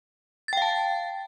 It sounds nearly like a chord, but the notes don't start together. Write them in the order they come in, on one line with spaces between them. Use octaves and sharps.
A6 G5 F5 A5